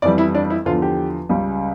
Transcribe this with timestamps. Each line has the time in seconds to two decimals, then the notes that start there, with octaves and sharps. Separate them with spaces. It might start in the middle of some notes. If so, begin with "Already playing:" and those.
0.02 F2 E3 G3 D5
0.18 E4
0.35 D4
0.50 E4
0.66 E2 D3 F3 F4
0.82 G4
1.29 C#2 C#3 G3